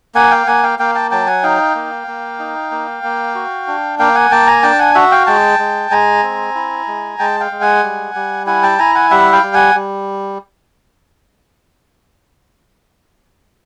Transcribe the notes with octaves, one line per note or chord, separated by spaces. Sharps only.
A#3 F#5 G#5
F5 G5
A#3 F#5 G#5
F5 G5
A#3 F5 G5
G5 A5
F#3 G5 A5
F#5 G#5
D#4 F5 G5
A#3
A#3
D#4
A#3
A#3
F#4
D4
A#3 F5 G5
F#5 G#5
A#3 G5 A5
G#5 A#5
D4 G5 A5
F#5 G#5
F#4 E5 F#5
F5 G5
G#3 G5 A5
G#3
G#3 G#5 A#5
C4
E4
G#3
G#3 G5 A5
F5 G5
G#3
F#5 G#5
G3
G3
E4 F#5 G#5
G5 A5
E4 G#5 A#5
F#5 G#5
G3 E5 F#5
F5 G5
G3
F#5 G#5
G3